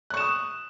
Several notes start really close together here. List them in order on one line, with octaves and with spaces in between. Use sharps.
F#6 C#6 E7 D#6